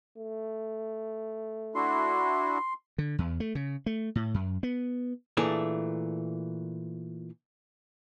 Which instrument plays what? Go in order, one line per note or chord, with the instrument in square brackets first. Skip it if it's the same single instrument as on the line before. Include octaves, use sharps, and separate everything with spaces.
[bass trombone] A3
[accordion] D4 E4 F#4 [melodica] C6
[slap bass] D3
E2
A3
C#3
A3
A2
F#2
B3
[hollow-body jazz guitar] A#2 E3 A3 D4 G#4